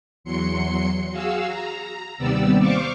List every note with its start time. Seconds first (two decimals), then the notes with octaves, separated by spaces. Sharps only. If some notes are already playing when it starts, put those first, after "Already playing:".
0.24 E2 F#3 C6 C#7
1.10 F#4 G#4 F5 E6
1.48 A#5
2.18 D#2 C3 G3 B3 D5 E6
2.59 C5 F5 C#6 D6